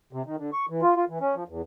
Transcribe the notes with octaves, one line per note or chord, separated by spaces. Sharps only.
C3
D#3
D3
C#6
E3
F4
F4
E3
C#4
F3
E2